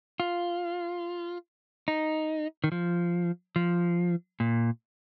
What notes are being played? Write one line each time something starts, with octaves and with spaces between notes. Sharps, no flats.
F4
D#4
D#3
F3
F3
A#2